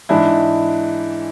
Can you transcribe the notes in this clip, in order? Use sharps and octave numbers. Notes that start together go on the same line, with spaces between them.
G#2 E3 D4 E4